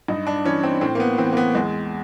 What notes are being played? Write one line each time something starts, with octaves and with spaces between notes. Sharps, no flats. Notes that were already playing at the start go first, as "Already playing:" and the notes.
G2 D#4
D4
E3 C#4
C4
A2 C4
A#3
B3
E3 C4
A#3
B3
E2 G#3